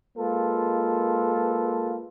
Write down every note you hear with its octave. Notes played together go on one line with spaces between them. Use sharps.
G#3 A#3 F4 A4 B4